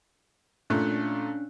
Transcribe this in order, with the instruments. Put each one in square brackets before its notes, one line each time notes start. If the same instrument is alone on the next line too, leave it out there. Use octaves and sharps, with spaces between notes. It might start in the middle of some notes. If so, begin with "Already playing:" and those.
[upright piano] A#2 A3 [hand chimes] C#4 D4 F#6